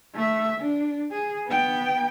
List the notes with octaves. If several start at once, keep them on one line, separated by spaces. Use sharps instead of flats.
A3 E5
D4
G#4
B3 G5